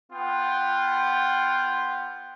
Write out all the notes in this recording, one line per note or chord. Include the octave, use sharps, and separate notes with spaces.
B3 F4 F#5 G5